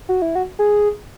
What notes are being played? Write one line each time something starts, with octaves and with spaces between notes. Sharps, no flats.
F#4
E4
F#4
G#4